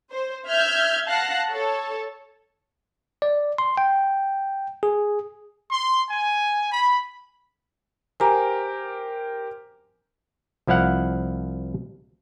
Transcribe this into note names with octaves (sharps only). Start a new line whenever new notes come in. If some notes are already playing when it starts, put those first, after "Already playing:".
C5
E5 F6 G6 G#6
F5 F#5 A5 F#6 A#6 C7
A4 C#5 A5
D5
C6
G5
G#4
C6
G#5
B5
G4 A#4 C5 G#5 A#5
C2 F3 E4 F5 F#5